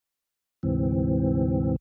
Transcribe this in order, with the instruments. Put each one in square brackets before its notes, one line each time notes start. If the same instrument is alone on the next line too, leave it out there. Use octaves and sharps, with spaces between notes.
[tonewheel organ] D2 G#2 C3 E3 C4